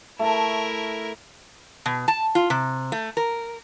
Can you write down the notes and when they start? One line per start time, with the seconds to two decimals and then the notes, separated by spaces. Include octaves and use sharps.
0.19 A3 E4 A#4 A5
1.86 B2
2.08 A5
2.35 F4
2.50 C3
2.92 A3
3.17 A#4